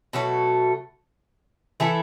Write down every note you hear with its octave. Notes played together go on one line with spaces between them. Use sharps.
B2 F#3 A3
E3 A3 E4 A4